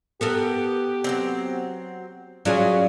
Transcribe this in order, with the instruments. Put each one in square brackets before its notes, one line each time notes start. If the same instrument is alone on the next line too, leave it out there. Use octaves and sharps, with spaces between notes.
[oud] B3 A4 A#4 [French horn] G4
[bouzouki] F#3 A#3 C4
[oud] F#3 F4 G#4 [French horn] C#4 [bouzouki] D5